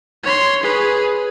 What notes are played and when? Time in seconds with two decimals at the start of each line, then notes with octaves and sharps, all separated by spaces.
0.23 C#5 C6
0.62 G#4 B4